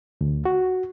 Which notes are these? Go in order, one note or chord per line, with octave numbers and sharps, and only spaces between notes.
D2
F#4